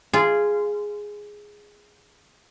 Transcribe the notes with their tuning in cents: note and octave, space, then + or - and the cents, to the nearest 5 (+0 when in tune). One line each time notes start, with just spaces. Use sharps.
F4 -15 G#4 +0